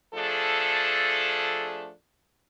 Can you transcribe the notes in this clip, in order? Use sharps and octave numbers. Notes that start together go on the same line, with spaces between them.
F3 A3 D4 G#4 A4